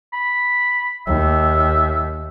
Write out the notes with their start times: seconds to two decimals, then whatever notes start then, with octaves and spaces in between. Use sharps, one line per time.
0.13 B5
1.07 D#2 E5